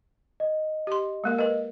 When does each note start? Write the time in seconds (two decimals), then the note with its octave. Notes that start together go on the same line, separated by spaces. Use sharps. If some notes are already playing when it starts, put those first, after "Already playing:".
0.40 D#5
0.87 G4 C6
1.24 G#3 A#3 A#4
1.39 A#4 B4 D#5